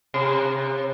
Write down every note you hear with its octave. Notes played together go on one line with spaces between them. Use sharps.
C3